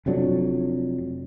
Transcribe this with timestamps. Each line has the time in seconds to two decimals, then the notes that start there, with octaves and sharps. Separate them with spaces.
0.06 F1 F2 F#3 D4